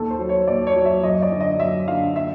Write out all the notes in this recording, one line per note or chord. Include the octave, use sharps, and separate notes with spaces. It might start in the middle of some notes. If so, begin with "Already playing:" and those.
Already playing: D#2 A4
C5
F#3
C#5
D#2 D5
C#5
F#3
E5
F#2 D#5
D5
D3
D#5
F#2 E5
D3 F5
E5